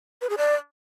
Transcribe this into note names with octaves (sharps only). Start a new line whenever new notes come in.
B4
G#4
D5